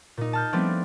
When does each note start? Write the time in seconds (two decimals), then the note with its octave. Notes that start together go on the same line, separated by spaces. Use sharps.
0.17 A#2 D#4
0.33 A5 F6 G6
0.53 F3 G3 A3 B3 C4 D4